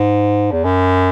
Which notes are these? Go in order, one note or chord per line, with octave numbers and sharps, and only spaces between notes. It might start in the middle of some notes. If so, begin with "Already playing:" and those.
Already playing: G#2
E2
F#2